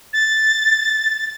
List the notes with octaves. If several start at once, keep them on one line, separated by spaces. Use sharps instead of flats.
A6